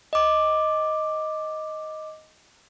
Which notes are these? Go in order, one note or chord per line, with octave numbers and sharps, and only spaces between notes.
D#5 D6